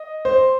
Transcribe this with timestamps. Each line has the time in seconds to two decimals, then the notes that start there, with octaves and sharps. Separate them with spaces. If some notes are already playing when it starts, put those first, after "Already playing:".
Already playing: D#5
0.25 C5